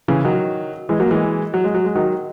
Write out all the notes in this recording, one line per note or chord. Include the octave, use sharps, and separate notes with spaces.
C#3 E3
D#3 F#3
E3 G#3
F#3 A#3
E3 G#3
F#3
G#3
F#3
G#3
D#3 F#3